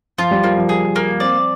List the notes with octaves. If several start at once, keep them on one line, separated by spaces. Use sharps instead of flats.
F3 F4
G3
F3 A#3
F3
G#4
A#3
C4 D5